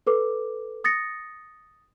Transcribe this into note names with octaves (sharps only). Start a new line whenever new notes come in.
A4 B4 D6
D#6 A6 A#6 C#7